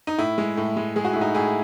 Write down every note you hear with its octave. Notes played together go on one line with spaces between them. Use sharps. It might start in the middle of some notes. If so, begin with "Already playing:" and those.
D#4
A2 E4
G#3
A2
G#3
G#3 G#4
F#4
A2 E4
D#4 F#4
A2 E4 G#4